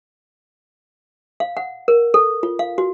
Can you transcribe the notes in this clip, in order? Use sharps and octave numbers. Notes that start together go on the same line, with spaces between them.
F5
F#5
A#4
A4
F4
F5
F#4